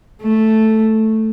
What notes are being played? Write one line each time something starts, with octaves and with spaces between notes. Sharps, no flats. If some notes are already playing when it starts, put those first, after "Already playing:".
A3